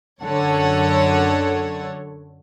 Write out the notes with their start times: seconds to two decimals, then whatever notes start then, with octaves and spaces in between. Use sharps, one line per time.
0.22 F#2 D3 A4 C#5 F#5